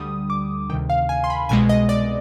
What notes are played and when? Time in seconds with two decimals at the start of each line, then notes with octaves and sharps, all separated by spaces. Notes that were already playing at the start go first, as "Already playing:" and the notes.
Already playing: D2 D3 G3 D#6
0.30 D6
0.70 D2 C3 D#3 G5
0.90 F5
1.09 G#5
1.24 C6
1.30 B5
1.49 C2 B2 G#3 G#5
1.69 D#5
1.89 D5